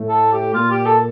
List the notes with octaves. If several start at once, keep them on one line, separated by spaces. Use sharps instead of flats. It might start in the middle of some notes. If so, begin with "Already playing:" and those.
Already playing: A2 A3
A4
G4
A#2 A#3 F4
G4
A4